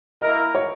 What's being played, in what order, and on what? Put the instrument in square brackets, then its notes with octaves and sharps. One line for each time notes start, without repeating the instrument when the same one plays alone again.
[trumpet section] A#3 E4 A#4 [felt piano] D#5
[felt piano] C#5